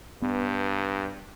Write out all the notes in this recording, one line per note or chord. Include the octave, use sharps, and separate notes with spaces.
G2 B3